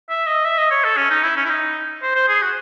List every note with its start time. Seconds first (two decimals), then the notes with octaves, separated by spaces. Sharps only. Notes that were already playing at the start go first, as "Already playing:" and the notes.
0.10 E5
0.27 D#5
0.45 E5
0.58 D#5
0.71 C#5
0.84 A4
0.97 C#4
1.10 D#4
1.24 E4
1.37 C#4
1.45 E4
1.50 D#4
2.02 C5
2.15 C5
2.29 G#4
2.42 F#4